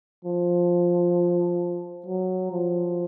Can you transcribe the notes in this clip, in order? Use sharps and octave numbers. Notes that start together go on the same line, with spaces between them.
F3
F#3
F3